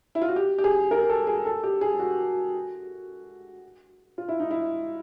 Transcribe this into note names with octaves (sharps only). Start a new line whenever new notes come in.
E4
F4
F#4
G4
G4
G#4
A#4
A4
G#4
A4
G4
G#4
F#4
F4
E4
D#4
E4